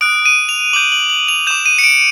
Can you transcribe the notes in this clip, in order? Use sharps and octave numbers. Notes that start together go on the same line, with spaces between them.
D#6 F#6 D7
D#7
F7
D6 G6 F#7
F#7
F#7
F7
D6 G6 E7
D#7
C#7
D7